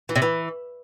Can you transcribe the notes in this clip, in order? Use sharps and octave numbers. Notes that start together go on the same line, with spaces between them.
E3
C3
E3